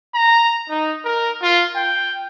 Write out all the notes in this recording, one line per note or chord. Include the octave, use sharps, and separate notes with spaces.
A#5
D#4
A#4
F4
G5